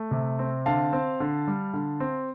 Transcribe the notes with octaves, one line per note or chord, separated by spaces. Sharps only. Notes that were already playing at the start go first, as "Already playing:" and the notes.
Already playing: A3
C3
C4
D3 F5 A5
C4
D3
G3
D3
C4